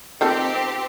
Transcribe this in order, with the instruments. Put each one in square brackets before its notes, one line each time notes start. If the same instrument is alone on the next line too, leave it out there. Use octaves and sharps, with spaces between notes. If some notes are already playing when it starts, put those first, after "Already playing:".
[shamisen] D#3 F4 A4 [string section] C4 G4